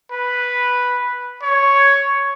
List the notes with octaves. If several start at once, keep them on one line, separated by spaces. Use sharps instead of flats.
B4
C#5